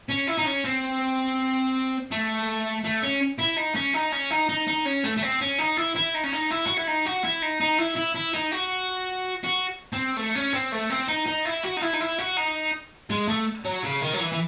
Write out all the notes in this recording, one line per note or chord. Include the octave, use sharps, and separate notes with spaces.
C#4
E4
D#4
C#4
C4
A3
A3
C#4
E4
D#4
C#4
D#4
C#4
D#4
D#4
D#4
C#4
A3
A3
C4
C#4
D#4
E4
E4
D#4
C#4
D#4
E4
F#4
E4
D#4
F#4
E4
D#4
D#4
E4
E4
E4
D#4
F#4
F#4
C4
A3
C#4
C4
A3
C4
D#4
D#4
E4
F#4
D#4
E4
D#4
E4
F#4
D#4
G#3
A3
F#3
C#3
D#3
F#3
E3
E3